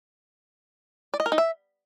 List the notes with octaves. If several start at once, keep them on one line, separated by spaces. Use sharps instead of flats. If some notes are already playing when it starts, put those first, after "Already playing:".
D5
D#5
A#4
D#4
E5